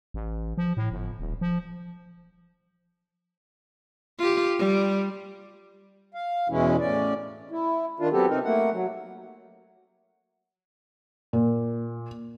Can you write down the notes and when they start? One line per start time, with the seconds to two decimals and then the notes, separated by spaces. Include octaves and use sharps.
0.14 A1
0.58 F3
0.77 A2
0.92 G1
1.20 D#1
1.41 F3
4.19 F4 G4
4.59 G3
6.15 F5
6.49 E2 B2 E3 G#3 C#4 E4
6.80 A2 C#4 D5
7.51 E4
8.00 D#3 D4 F4
8.12 F#3 B3 C4 G4 A4
8.29 C3 C4 D#4 A#4
8.45 A3 A#3 F#5
8.72 F#3
11.33 A#2